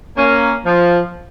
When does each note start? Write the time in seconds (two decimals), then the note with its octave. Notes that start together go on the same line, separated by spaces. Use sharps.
0.17 A#3 C#4
0.65 F3